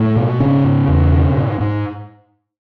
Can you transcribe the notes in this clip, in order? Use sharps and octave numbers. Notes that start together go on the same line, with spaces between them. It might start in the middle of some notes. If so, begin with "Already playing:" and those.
Already playing: A2 A3
B2
G#2 C#3 C#4
G#2
E2
B2
G#2
G#2